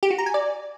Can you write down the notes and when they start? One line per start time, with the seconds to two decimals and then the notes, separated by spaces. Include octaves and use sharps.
0.03 G4
0.10 F#4
0.18 A#5
0.26 G#5
0.34 D5